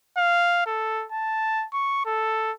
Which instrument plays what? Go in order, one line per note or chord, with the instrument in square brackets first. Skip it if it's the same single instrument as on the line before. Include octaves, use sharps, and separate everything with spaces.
[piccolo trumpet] F5
A4
A5
C#6
A4